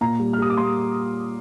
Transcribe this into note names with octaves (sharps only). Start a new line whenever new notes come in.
A#2 A#5
G3
F6
G3 D#6
D6
A#3 C6